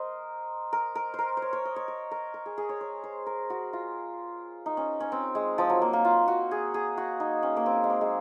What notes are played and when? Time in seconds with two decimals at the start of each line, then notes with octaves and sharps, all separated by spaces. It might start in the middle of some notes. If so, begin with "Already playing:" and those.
Already playing: A#4 C5 D#5
0.73 A#4
0.95 A#4
1.14 A#4 C5
1.37 C5
1.42 C#5
1.53 C#5
1.65 D#5
1.76 C#5
1.88 C#5
2.11 A#4
2.34 A#4
2.46 G#4
2.58 G#4
2.69 C#5
2.81 C#5
3.04 C5
3.26 A#4
3.50 F#4
3.73 F4
4.66 D#4
4.77 C#4
5.00 C#4
5.12 C4
5.35 G#3
5.58 F3
5.70 F#3
5.81 A#3
5.93 A#3
6.05 F4
6.28 F#4
6.51 G#4
6.74 G#4
6.98 F#4
7.20 D#4
7.43 C#4
7.57 A#3
7.66 C4
7.84 G#3
7.90 A#3
8.01 G#3